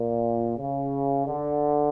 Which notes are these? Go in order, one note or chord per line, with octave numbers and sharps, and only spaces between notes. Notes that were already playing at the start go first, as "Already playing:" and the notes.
Already playing: A#2
C#3
D3